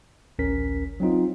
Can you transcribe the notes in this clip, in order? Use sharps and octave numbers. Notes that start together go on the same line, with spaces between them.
A1 D2 C#4 A#4 B6
F#3 C4 D#4 F4